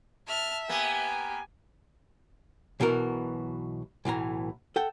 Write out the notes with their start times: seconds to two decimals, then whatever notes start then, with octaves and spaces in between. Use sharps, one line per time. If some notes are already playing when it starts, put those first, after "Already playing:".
0.27 E5 A5 F6
0.69 A#3 B3 G4 G#5
2.80 B1 B2 E3 F#4 A#4
4.05 B1 A2 E3 A#5
4.76 A4 F#5 G5